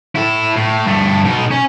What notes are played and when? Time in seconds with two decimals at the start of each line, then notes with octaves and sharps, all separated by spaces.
0.15 E4 A4
0.56 A2
0.86 G2 A3
1.25 B2 D#4
1.51 C#4